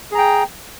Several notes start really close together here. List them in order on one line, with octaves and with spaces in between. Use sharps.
G#4 A#5 G5